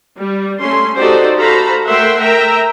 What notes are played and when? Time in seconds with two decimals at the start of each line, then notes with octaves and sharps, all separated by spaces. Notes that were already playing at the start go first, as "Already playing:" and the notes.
0.16 G3
0.60 A3 C#4 C6
0.98 D#4 F#4 G4 A4 C5 D5
1.37 F#4 A4 C5 F5 A#5 B5
1.86 A3 A#4 E5 F#5 G5 C6
2.20 A#4 E5 G5 A#5